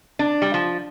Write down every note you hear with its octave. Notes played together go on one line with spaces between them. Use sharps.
D4
G3
F3